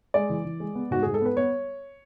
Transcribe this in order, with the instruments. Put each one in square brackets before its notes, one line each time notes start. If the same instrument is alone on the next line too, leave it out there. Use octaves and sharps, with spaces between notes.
[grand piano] G#3 D5
E3
E3
G#3
B3
G#2 F#4
G#2 G#4
A4
B3 B4
B3 C#5